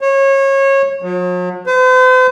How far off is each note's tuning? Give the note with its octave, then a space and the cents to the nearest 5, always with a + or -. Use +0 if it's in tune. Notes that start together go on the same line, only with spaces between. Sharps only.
C#5 -25
F#3 -45
C5 -45